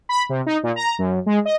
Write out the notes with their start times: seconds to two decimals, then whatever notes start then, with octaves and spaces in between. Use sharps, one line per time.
0.09 B5
0.29 C3
0.46 D#4
0.63 A#2
0.76 A#5
0.99 F#2
1.26 G#3
1.45 D#5